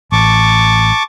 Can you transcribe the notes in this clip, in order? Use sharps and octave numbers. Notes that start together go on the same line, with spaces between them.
A1 A5 C#6 D6